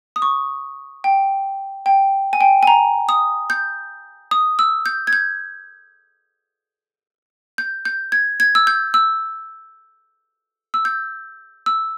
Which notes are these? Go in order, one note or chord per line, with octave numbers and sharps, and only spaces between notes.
D#6
C#6
G5
G5
G#5
G5
G#5
A#5
D#6
G6
D#6
E6
G6
G#6
G6
G6
G6
G#6
G#6
E6
G6
E6
E6
G6
E6